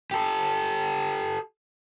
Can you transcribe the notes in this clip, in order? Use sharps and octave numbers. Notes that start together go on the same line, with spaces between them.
G4 A4